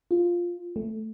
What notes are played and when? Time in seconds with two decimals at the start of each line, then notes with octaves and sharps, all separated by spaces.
0.11 F4
0.76 A3